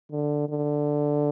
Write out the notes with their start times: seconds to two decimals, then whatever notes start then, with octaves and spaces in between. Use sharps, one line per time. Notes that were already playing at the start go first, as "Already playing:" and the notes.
0.11 D3
0.49 D3